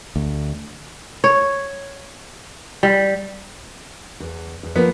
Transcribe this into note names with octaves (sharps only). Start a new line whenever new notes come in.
D2
C#5
G3
E2
E2
F3 A#3 B3